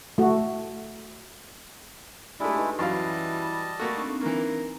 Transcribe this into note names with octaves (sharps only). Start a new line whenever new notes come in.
A3 F#4
G#3 A3 D4 E4 F4 G4 A5
D#4 B4 C6
F#2 E3 G3 F#4 D#5 F5 A5 B5
A3 A#3 F#4 A4
C4 D4 D#4
E3 A#3 A#4